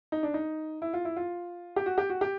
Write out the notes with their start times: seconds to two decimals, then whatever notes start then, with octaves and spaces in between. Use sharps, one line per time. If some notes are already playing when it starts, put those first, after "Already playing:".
0.12 D#4
0.23 D4
0.34 D#4
0.82 E4
0.93 F4
1.05 E4
1.17 F4
1.76 G4
1.86 F#4
1.98 G4
2.10 F#4
2.21 G4